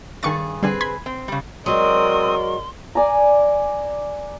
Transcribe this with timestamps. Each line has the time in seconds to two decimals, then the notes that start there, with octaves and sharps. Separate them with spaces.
0.23 G2 D#3 G#4 C#6 A6
0.63 D3 G3 C4 G#4 B4
0.81 B5 C6 G#6
1.06 C4
1.28 C#3 G3
1.66 F#3 G#3 C4 F#4 A#4 D5 C6 D#6
2.95 D5 G#5 A#5